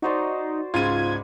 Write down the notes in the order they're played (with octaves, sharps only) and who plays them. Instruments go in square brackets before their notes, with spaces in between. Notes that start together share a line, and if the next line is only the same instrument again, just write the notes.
[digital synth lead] D#4 [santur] F#4 C5 D5
[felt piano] C#2 G#2 [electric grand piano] F4 D#7 [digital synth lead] G#6